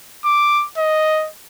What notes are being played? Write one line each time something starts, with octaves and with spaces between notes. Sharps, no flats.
D6
D#5